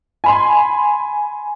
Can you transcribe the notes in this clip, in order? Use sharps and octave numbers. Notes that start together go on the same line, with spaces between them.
G#5 B5 C6